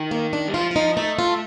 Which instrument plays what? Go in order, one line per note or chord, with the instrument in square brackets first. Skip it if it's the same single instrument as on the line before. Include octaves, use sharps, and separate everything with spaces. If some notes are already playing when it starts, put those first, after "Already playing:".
Already playing: [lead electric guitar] D#3
[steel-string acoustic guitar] A#3
D4
[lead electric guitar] G3
[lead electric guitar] F3 [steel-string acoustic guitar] F4
[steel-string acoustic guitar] F4
D#4
[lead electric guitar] A3 [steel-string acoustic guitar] D#4
[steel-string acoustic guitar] F4